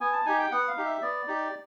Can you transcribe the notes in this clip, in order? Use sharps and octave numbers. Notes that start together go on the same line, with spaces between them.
B3 G#5
A5
D#4 G4 G#5
G5
B3 F#5
F5
D#4 G4
E5
B3 D5
D#4 G4